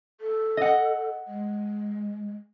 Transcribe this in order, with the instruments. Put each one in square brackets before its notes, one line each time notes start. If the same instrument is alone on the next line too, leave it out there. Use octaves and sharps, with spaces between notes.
[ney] A4
[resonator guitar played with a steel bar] D#5 F#5
[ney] G#3